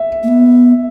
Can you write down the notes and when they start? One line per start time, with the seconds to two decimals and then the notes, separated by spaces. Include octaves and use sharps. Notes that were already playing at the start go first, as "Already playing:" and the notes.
Already playing: E5
0.23 A#3
0.28 B3